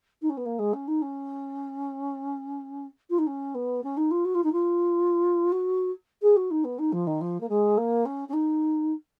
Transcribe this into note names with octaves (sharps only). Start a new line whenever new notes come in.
D#4
C#4
B3
A#3
G#3
C#4
D#4
C#4
F4
D#4
C#4
B3
C#4
D#4
F4
F#4
F4
D#4
F4
F#4
G#4
F#4
D#4
B3
D#4
F3
D#3
F3
A#3
G#3
A#3
C#4
C#4
D#4